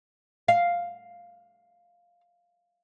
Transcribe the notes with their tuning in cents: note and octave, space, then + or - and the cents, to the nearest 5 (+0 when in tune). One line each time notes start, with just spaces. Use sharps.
F5 +0